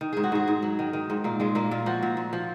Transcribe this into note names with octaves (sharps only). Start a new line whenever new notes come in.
D#3
G#2 G#4
F#4
G#2 G#4
G#2
F#3
D#3
D#3
G#2
A#2 A#3
A#2 G#3
A#2 A#3
A#2 F4
F3 F#4
A#2
A#2
F3